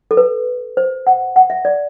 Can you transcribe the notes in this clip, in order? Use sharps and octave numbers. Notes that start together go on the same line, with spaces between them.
A4
B4
C5
F#5
F#5
E5
D5